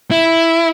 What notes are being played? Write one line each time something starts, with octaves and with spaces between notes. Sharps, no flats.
E4